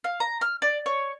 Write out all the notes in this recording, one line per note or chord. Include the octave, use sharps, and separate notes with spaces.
F5
A#5
F6
D5
C#5